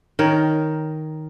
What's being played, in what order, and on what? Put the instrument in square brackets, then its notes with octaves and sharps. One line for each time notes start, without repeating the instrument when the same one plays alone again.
[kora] D#3 A#4 C#5